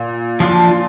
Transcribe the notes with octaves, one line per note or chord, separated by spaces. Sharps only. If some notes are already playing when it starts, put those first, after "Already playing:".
Already playing: A#2
F3 D4 F4